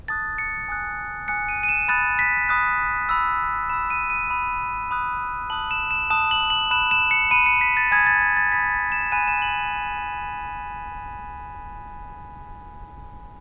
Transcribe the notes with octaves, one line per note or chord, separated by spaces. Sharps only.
A5 D#6 F#6 A6
C#7
G#5 D#6 F#6
G#5 D#6 F#6 C#7
D#7
D#7
E7
B5 D#6 F#6 A6
B6
B5 D#6 F#6
B5 E6
B5 E6 E7
D#7
D#7
B5 D#6 F#6
B5 D#6 F#6
A5 D#6 F#6 F#7
E7
E7
A5 D#6 F#6 E7
F#7
F#7
B5 F#6 E7
E7
C#7
B5 F#6 D#7
C#7
B6
A6
G#5 B5 D#6 G#6
A6
G#6
A6
G#5 B5 D#6 B6
A6
E7
G#5 B5 F#6 D#7
E7
F#7